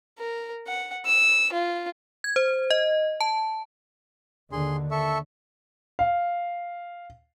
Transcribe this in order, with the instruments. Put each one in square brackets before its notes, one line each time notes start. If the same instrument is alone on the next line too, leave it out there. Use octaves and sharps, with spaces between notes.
[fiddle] A#4
F#5
E6
F4
[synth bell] G#6
C5
D#5
A5
[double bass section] D#2 D3 [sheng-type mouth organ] G#4 C6
[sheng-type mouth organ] A4 E5 C#6
[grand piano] F5